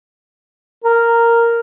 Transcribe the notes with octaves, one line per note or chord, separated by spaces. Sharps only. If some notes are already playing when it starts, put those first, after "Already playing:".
A#4